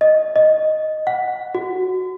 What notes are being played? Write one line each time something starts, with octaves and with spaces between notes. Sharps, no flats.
D#5
D#5
F#5
F#4